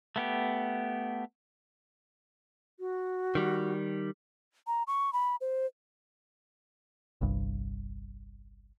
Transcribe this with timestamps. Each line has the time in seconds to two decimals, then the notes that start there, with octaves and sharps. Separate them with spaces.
0.16 A3 B3 G4
2.80 F#4
3.35 D#3 G3
4.67 A#5
4.87 C#6
5.13 B5
5.41 C5
7.21 G1 C2 G2